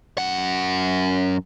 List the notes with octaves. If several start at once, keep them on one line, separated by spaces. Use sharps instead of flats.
F#2 F#5